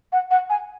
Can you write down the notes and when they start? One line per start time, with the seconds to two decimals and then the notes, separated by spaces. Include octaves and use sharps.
0.12 F#5
0.31 F#5
0.50 G#5